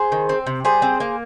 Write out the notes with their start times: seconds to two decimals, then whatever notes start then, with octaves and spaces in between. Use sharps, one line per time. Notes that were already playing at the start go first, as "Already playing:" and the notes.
Already playing: G#4 C5
0.12 D#3
0.29 C4
0.46 C3
0.65 G3 G#4 C5
0.82 C4
1.00 A#3